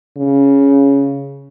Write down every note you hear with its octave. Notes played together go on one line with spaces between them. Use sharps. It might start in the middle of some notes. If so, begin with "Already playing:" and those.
C#3